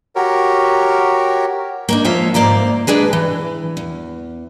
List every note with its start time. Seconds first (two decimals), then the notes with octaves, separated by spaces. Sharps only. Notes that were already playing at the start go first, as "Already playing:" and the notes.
0.16 F#4 G4 A#4 C#5
1.89 A#3 D4 D#4
2.05 F3 G#3 A#3 F4 C#5 E5
2.34 G#2 A#3 C5 D5 A#5
2.87 G#3 D4 G#4 B4
3.13 E3
3.77 E2